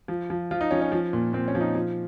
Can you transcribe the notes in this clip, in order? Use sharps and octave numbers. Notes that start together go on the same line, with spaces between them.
F3
F3
F3 F4
D#4
F3 C#4
C#4
F3
A#2
A#2 C4
C#4
F3
D#4
F3